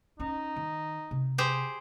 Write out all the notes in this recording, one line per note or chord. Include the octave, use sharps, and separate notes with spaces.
C#4 D#4
D#3
C3
G4 G#4 C5